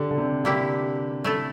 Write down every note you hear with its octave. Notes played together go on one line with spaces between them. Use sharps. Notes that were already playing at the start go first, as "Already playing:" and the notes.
Already playing: D3 G4
D3
C3
D3 A#3 E4 G4
A3 E4 A4